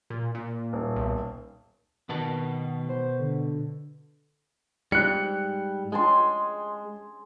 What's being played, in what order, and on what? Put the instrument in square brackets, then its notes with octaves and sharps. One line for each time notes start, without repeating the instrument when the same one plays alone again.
[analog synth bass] A#2
A#2
[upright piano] D#1
[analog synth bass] B1
[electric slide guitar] B2 B4 A5 [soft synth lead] D#3
[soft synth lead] C5
D3
[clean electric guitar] G#2 G3 [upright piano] F#6 C#7
[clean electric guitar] G#3 [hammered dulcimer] G#4 A5 C6